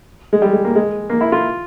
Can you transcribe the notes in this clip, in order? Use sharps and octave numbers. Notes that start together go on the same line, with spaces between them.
G#3
G3
G#3
A#3
G#3
A#3
E4
F4